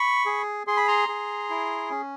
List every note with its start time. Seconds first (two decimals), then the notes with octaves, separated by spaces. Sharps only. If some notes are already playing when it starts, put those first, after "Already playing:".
Already playing: B5 C#6
0.26 G#4
0.67 G#4 C6
0.77 B5
0.88 A#5 C6
1.08 G#4
1.50 E4
1.91 C#4